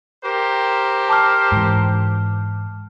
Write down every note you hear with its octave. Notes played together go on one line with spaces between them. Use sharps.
G4 A#4 C5
A5 D6 F6
G#2 E3